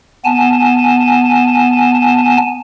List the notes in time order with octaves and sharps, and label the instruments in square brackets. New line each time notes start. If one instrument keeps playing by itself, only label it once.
[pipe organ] B3 G#5 A5